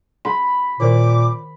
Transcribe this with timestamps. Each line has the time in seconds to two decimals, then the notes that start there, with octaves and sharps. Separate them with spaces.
0.25 B5 C6
0.80 A#2 D#3 A#4 C5 D6